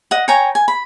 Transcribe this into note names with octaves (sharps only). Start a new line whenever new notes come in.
D#5 F#5
C#5 G5 G#5 A#5
G#5
B5